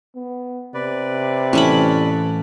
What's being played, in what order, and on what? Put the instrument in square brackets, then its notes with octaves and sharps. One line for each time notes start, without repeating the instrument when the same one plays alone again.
[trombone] B3
[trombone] C3 [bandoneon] B4 D5
[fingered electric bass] A2 E3 [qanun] C#4 A4 B5